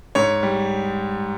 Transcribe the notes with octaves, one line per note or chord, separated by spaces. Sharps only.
G#2 C#5
G3